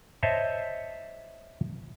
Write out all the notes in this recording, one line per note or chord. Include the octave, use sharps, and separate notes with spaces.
C5 C#5 D#5 E5 A5